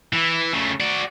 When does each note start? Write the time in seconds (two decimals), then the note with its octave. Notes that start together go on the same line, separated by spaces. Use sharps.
0.13 E3
0.53 C#3 A3
0.80 F#4 D5